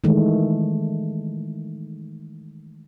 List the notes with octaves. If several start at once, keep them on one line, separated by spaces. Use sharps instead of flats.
D#3 E3 G#3 A3